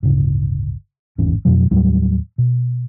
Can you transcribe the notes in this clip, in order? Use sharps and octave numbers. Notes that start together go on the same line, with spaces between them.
D1 G1 C#3
D1 G#1 E2 C#4
F2 G#2 B2 F#3
D#2 A2 F#3 G3
B2